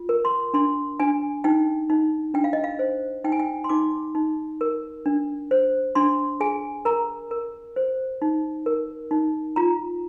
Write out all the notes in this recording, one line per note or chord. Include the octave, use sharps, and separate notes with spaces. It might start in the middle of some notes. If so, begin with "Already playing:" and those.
Already playing: F4
A#4
C6
D4 C6
D4 G#5
D#4 G5
D#4
D4 G5
F5
D#5
F5
C5
D#4 G5
G#5
G5
C6
D#4 D6
D#4
A#4
D4
C5
D4 C6
G#4 G#5
A#4 A#5
A#4
C5
D#4
A#4
D#4
F4 A#5